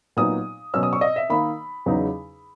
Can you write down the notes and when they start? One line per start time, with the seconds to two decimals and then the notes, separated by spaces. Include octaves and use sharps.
0.17 A#2 F#3 B3 D#4 D#6
0.74 B2 F#3 C#4 E6
0.83 D#6
0.93 C#6
1.01 D#5
1.16 E5
1.29 D#3 A#3 D#4 B5
1.86 E2 C#3 F#3 B3 D#4